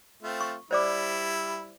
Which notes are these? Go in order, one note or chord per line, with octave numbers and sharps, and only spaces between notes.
A3 C4 F4
C#6
G3 E4 C5 D5 D6